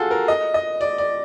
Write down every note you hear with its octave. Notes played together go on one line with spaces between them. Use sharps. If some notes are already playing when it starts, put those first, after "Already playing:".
Already playing: F4 F#4 G#4 A4
A#4
D#5
D#5
D5
D5